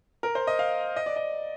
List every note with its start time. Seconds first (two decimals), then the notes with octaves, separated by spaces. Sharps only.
0.23 A#4
0.35 C5
0.47 D#5
0.59 F5
0.96 D#5
1.06 D5
1.16 D#5